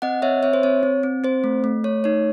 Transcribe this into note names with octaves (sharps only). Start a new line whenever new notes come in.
C4 D#5 F#5
C4 C#5 E5
C4 C#5 E5
C5
C4 C#5
C4
C4
C4 C5
A3
A3
A3 C#5
D#4 C#5